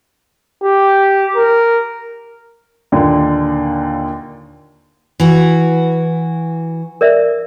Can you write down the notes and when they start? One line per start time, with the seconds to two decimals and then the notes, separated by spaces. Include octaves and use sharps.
0.63 G4
1.36 A#4
2.92 D#2 A#2 D3
5.20 E3 F#4
7.01 A#4 D5 E5